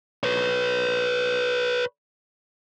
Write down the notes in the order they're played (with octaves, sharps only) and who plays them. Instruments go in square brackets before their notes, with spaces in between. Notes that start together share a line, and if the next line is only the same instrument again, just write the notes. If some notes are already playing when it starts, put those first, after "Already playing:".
[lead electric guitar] B4 C#5